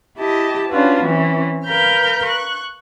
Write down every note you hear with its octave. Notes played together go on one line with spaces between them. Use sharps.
E4 G4 D#5 A5
C#4 D4 F4 F#4 B4
E3 C4 C#4
A#4 B4 F5 F6 G6
C#6 F#6